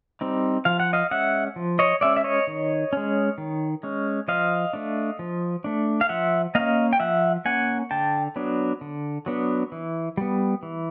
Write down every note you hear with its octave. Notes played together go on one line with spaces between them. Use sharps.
G3 C4 D#4
F3 F5
F#5
D#5 F5
G#3 C#4 E5 F#5
F3
C#5 D#5
G#3 C#4 D5 E5
E5
C#5 D#5
D#3
G#3 C#4
D#3
G#3 C#4
F3 D#5 F5
A3 D4
F3
A3 D4
F5
F3 E5 F#5
A#3 C#4 D#5 F5
G5
F3 E5 F#5
A#3 C#4 F#5 G#5
D3 G5 A5
F#3 B3 D4
D3
F#3 B3 D4
E3
G3 B3
E3